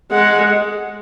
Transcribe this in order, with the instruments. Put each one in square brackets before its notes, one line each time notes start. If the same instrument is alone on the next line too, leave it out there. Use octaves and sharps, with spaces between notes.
[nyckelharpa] G#3 [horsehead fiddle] F#5